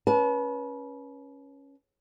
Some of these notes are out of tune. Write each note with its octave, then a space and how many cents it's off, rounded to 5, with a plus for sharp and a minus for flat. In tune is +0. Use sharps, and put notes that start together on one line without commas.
C#4 +0 B4 -30 A5 -40